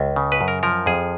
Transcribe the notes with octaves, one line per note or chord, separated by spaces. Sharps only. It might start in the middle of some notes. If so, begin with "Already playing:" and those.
Already playing: C#2
C#3
B4
F#2
A#4
F3 A#4
F2 G#4